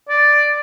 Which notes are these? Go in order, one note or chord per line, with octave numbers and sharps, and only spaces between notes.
D5